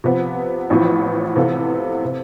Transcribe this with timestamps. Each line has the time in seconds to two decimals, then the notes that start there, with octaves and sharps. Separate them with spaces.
0.04 C3 F3 B3
0.70 A1 A2 F3 B3
1.36 C3 E3 B3 F4 A4
2.04 C3